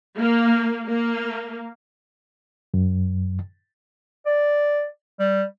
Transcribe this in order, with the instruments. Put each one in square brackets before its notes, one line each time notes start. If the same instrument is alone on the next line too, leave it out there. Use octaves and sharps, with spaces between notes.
[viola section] A#3
A#3
[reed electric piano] F#2
[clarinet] D5
G3